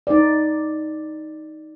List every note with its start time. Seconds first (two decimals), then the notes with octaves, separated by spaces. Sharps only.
0.07 D#4 D5